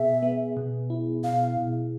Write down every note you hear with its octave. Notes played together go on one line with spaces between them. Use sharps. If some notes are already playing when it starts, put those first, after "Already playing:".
Already playing: B2 B3 G#4 E5
B3
B2
E4
B2 F5
B2